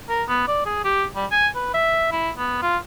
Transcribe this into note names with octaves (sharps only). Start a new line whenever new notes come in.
A#4
B3
D5
G#4
G4
G3
G#5
B4
E5
E4
B3
F4